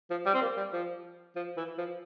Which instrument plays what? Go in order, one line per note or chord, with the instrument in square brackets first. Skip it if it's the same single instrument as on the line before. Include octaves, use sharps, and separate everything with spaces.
[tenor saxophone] F3
G3
C4
A#3
G3
F3
F3
E3
F3